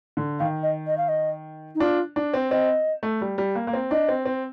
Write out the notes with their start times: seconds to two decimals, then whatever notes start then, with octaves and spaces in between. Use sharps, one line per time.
0.17 D3
0.39 D#3 F5
0.63 D#5
0.87 D#5
0.97 F5
1.08 D#5
1.75 D#4
1.80 D4 F4
2.16 D4
2.34 C4
2.51 C4 D#5
3.03 A3
3.21 G3
3.38 G3
3.55 A#3
3.67 A#3
3.73 C4
3.91 D4 D#5
4.09 C4
4.26 C4